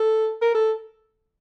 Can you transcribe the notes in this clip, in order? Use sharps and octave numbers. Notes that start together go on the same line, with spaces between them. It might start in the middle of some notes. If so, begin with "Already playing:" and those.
Already playing: A4
A#4
A4